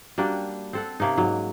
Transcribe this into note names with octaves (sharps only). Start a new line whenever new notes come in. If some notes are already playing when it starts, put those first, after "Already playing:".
G3 A#3 D4 F#4
C4 A4 F#5
C3 A#3 C#4 D#4
G#2 F#3